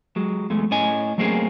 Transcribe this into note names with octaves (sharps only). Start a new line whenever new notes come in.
F#3 G#3
E2 G#3 A3
A2 C#4 D#5 G#5
F#3 A3 A#3 C4 C#4 G#4